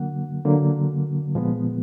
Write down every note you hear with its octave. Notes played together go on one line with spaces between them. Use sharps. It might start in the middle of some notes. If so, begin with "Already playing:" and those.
Already playing: D3 F#3 A#3 F#5
D3 F#3 A#3
A#2 F3 G#3 B3